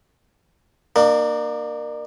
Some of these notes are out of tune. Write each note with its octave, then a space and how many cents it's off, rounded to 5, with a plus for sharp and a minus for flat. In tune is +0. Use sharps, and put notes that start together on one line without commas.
A#3 +0 D4 +45